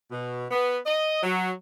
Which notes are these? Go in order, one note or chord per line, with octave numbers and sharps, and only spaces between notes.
B2
B3
D#5
F#3